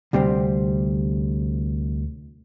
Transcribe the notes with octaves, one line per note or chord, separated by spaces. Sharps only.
D2 C3 G3 C4